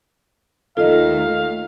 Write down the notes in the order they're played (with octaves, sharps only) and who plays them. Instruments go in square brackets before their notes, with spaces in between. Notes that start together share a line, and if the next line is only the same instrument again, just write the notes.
[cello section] D#2 D#3 A3 [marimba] F4 D#5 [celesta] A4 [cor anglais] F5